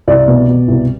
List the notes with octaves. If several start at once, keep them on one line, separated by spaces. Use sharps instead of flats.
C2 D5
B2
B2
C2